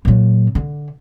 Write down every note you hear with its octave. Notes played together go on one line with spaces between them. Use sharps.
A#2 F#3
D3